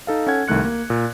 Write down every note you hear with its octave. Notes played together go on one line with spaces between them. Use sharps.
D#4 A4 F5
C#4 A4 F#5 G#6
C2 D#3 A3 F#6 C#7
A#3
A#2